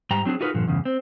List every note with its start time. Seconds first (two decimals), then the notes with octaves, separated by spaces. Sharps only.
0.11 G#2 G3 G5 A#5
0.25 F#3 C4 D4 G#4
0.41 D#4 F4 F#4 G#4 A#4 B4
0.54 G2 A#2 D3 F3
0.68 E2 G2 C#3
0.85 C4